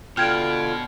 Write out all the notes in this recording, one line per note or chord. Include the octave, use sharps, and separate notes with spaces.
B2 D3 F4 G5 F6 G#6 D7